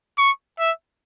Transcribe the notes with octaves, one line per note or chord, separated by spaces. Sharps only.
C#6
E5